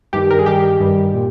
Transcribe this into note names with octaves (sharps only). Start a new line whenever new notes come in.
G2 D#3 G3 G4
A#4
G#4
G2 D#3 G3 G4
G2 D#3 G3
A#2